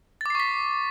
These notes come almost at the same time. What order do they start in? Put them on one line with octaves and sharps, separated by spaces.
A6 D6 C7 C#6 B6